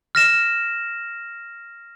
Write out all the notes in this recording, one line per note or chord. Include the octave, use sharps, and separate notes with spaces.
F6 A#6 E7